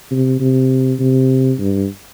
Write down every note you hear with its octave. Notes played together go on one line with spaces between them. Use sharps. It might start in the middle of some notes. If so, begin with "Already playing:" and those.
C3
C3
C3
G2